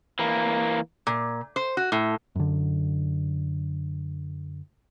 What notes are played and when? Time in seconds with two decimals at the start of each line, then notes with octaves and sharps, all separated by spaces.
0.19 E3 A#3
1.07 A#2
1.56 C5
1.77 F#4
1.92 A2
2.36 F#2 D3